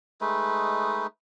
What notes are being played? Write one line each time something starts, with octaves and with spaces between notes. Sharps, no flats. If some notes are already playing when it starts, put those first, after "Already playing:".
G#3 A3 D#4 B4